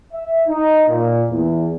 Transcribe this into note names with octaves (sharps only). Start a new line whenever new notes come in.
E5
D#4
A#2
E2